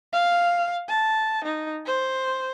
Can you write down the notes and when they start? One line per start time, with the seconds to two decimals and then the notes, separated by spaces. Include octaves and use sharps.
0.13 F5
0.89 A5
1.44 D#4
1.86 C5